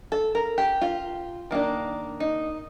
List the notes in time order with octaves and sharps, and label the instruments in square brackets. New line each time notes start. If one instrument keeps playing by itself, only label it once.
[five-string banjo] A4
A#4
G4
F4
D#3 A#3 D4
D#4